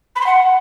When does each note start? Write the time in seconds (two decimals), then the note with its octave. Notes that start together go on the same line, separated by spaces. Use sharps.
0.16 B5
0.21 C6
0.26 F#5